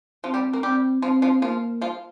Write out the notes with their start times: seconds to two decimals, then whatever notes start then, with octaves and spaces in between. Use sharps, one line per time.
0.24 F3 C4 F4
0.34 G3 G4
0.53 A#3 A#4
0.63 G3 C4 G4
1.02 F3 C4 F4
1.22 F3 F4
1.42 F3 A#3 F4
1.81 F3 F4